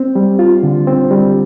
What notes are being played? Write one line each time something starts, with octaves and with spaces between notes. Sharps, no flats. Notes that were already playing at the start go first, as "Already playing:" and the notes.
Already playing: C4
G3
F4
D3
C4
G3